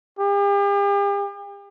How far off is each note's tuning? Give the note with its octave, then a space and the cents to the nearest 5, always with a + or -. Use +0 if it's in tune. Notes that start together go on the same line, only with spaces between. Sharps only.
G4 +40